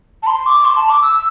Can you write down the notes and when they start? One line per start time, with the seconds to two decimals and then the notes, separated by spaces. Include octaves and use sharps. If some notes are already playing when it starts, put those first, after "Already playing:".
0.23 A5
0.27 C6
0.46 D6
0.65 C6
0.76 A5
0.89 D6
1.02 E6